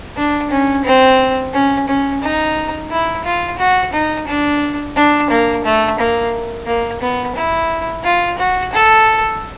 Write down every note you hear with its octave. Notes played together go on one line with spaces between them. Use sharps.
D4
C#4
C4
C#4
C#4
D#4
E4
F4
F#4
D#4
D4
D4
A#3
A3
A#3
A#3
B3
E4
F4
F#4
A4